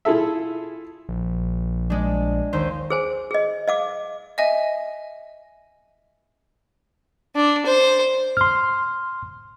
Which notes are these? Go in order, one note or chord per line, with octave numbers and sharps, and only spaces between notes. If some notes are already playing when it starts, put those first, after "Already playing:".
E4 F4 G#4 A4 E5
A#1
G#3 D4
D#2 C5
G#4 C5 G#5
G#4 D#5
D#5 F5 D6
D#5 E5 G#5
D4
C5
C6 F6